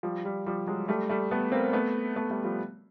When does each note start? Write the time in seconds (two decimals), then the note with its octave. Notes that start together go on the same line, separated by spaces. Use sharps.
0.03 F3 G3
0.25 F3 G3
0.46 F3 G3
0.67 F#3 G#3
0.88 G3 A3
1.09 G3 A3
1.31 A3 B3
1.52 A#3 C4
1.73 A3 B3
2.16 A3 B3
2.30 G3 A3
2.44 F3 G3